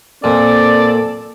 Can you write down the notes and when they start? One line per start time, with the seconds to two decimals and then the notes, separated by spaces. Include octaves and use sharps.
0.24 A#2 C4 A4 D5